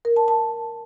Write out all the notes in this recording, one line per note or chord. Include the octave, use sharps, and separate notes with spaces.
A#4
A5
A5